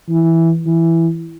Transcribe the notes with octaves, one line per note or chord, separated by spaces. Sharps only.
E3
E3